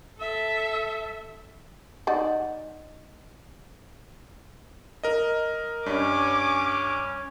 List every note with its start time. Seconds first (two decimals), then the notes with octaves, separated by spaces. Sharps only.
0.19 A4 E5
2.07 D#4 D5 F#5
5.03 A#4 D#5
5.86 G2 C#4 D6